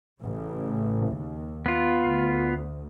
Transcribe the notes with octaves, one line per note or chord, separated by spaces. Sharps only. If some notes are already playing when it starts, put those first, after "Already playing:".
A1 C#3
D#2
B3 F4
D2